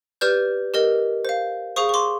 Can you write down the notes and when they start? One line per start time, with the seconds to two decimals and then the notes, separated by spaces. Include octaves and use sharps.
0.21 G4 B4 D5 F6 G6
0.74 G4 A#4 D#5
1.25 C5 F5
1.76 G#4 C5 F5 C#6 D#6
1.89 C#6
1.94 C6 D6